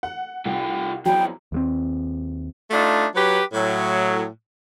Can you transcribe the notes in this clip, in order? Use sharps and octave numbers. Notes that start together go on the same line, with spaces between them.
F#5
C2 F4 G4
F2 E3 F#3 G5
D#2 G#3 C4
A3 D4 D#4 F4
F#3 G4 B4
A2 F#3